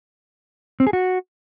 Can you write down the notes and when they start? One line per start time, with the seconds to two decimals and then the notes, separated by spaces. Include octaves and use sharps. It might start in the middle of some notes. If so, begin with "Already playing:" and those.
0.80 C4
0.87 G#4
0.93 F#4